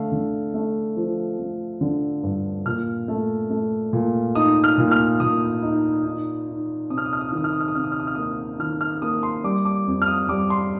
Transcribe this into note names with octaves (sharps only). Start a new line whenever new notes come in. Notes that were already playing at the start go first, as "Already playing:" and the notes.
Already playing: D3 A3 F5
D3
A3
F3
A3
D3
G2
A#2 F6
A3
A3
A#2
D#4 D#6
F6
A#2
F6
A#2 D#6
D#4
D#4
D#4
C3 D#6
F6
D#6
F6
D#6
F6
D#3 D#6
F6
D#6
F6
D#6
C3 F6
D#6
F6
D#6
F6
A#3 D#6
D#3 F6
F6
A#3 D#6
C6
G3 D6
D6
F2
F6
D#6
G3 D6
C6